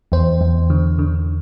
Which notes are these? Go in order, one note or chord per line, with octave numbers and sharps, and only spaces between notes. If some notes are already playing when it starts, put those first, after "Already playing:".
E2 C5
E2
D3
D3